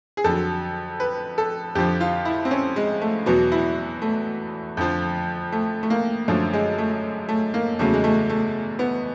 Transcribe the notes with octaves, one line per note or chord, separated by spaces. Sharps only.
G#4
F2 D3 F#3 A4
B4
A4
F2 D3 F3 G4
F4
E4
C4
C#4
G#3
A3
E2 B2 F#3 B3
E4
A3
F2 D3 F3
A3
A3
A#3
F#2 D3 F3 A3
G#3
A3
A3
A#3
E2 C#3 F#3 A3
G#3
A3
A3
B3